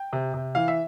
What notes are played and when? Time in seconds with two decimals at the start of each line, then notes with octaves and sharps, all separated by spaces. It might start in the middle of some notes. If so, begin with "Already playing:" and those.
Already playing: G5
0.13 C3
0.34 C3
0.55 E3 F5
0.68 E5